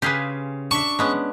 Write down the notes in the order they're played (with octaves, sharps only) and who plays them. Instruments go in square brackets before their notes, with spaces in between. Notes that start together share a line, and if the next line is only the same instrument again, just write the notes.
[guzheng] C#3 F5 C6 [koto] G4 G#4 B4
[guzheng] D4 E5 [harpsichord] C#6
[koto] G#3 B3 C#4